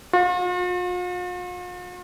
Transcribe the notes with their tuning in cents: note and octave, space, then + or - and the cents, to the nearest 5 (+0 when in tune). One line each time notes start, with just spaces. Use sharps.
F4 +45